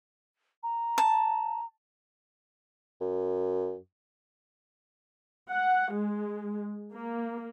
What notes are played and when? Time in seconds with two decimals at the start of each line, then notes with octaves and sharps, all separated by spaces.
0.63 A#5
0.98 A5
3.01 F#2
5.49 F#5
5.92 G#3
6.93 A#3